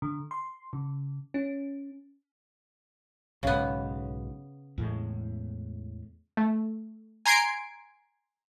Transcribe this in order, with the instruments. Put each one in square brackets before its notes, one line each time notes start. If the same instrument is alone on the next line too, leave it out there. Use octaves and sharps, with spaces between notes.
[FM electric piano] D3
C6
C#3
C#4
[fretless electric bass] B1 G#2 [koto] C#3 B3
[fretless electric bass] E2 A2 G#3
[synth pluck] A3
G#5 A#5 C6 G#6 C7 D7